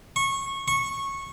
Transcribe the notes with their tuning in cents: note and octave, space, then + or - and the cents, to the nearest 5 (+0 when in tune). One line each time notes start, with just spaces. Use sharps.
C#6 -20
C#6 -15